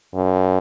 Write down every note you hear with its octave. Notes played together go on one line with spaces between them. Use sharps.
F#2